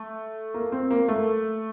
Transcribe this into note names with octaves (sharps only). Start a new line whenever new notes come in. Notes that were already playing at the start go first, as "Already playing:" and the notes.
Already playing: A3
A#3
C4
A#3
A3